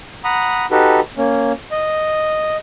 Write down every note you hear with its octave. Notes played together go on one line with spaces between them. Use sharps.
F#5 A#5 B5 D#6
D#4 F#4 G4 A4 B4
A#3 C#4
D#5